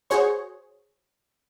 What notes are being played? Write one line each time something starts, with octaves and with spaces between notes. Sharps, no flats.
F#4 G#4 C5 C#5 C#6